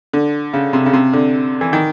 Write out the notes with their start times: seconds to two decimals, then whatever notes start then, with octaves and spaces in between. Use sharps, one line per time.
0.13 D3
0.53 C#3
0.73 C3
0.86 C#3
0.93 C3
1.13 D3
1.61 E3
1.73 D#3